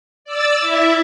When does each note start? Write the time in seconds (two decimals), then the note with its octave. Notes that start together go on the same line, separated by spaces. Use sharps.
0.25 D5 E6 A6
0.60 E4 E5